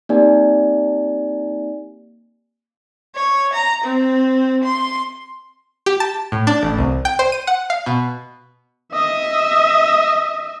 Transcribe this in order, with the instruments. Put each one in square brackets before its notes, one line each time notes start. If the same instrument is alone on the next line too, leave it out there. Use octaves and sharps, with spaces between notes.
[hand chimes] A#3 C4 D#4 G4 D5 G#5
[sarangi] C#5
A#5
C4
C6
[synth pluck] G4
A5
A2
D4
A1
C2
G5
C5
D#7
F#5
F5
B2
[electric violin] D#5 E5